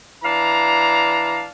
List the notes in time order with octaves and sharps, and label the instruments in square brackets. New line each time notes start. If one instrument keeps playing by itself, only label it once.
[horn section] E3 D4 F5 A#5